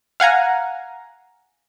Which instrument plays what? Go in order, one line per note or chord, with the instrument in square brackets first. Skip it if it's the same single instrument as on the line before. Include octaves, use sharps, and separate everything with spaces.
[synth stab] F5 F#5 G#5 A#5